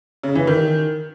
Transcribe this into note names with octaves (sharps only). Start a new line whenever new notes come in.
C#3
E3
D#3